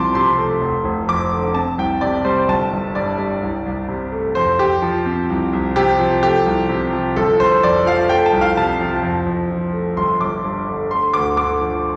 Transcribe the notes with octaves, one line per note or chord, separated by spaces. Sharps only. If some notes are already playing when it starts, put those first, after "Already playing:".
Already playing: C2 F3 C4 A5 C6 D6
C3 C6
A3
F1
F1
F2 D6
D3
C4 A5
C2 G5
C3 D5
G3 C5
G1 A5
G1
G2 D5
G3
C2
C2
C3
A3
F2 C5
F2 G4
F3
C4
C2
C2
C3 G4
F3
A3 G4
C2
C3
F3
G1 A4
G1 C5
F2 D5
F3 F5
A3 G5
A5
C2
F5
C3 A5
F3
F2
F2
F3
A3
G1 C6
G1 D6
G2
D3
A3 C6
D2 D6
D3 D6
F3